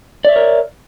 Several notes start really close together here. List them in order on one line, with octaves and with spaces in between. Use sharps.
D5 E5 C#5 A#4